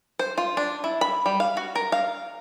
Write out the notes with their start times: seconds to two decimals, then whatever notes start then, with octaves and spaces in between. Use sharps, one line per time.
0.19 C5
0.38 F4
0.57 D4
0.84 E4
1.01 B5
1.26 G3
1.40 F5
1.57 F#4
1.75 A#4
1.92 F5